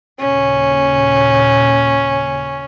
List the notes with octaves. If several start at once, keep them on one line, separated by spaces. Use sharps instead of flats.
D#2 A#2 C#3 C#4